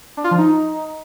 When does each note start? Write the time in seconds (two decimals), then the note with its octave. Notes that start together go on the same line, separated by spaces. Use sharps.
0.17 D4
0.24 F4
0.31 F3
0.38 D#4